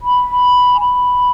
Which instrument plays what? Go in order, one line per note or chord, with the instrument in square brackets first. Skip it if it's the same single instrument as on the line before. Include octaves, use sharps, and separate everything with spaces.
[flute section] B5
G#5
B5